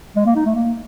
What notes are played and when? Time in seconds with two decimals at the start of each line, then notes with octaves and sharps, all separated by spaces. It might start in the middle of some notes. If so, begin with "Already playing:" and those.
0.16 G#3
0.26 A#3
0.36 D#4
0.45 A3
0.55 A#3